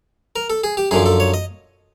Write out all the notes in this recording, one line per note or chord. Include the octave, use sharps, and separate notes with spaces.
A#4
A4
G#4
G4
F#2 D3 F3 G#4
A4
C#5
D#5